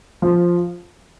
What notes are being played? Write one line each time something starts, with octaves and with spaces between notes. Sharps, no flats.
F3